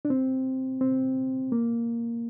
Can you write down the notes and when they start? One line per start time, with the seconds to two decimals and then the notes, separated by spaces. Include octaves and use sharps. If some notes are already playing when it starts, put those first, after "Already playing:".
0.05 D4
0.10 C4
0.81 C4
1.52 A#3